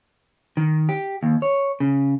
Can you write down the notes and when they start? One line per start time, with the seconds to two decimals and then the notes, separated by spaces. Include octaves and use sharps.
0.57 D#3
0.89 G4
1.23 D#2
1.42 C#5
1.80 C#3